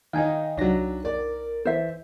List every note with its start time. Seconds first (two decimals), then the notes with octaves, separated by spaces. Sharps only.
0.13 D#3 D#4 F5 G5 G#5
0.57 C2 F#3 D4 D#4 A#6
1.05 A#4 D5
1.65 E3 C5 E5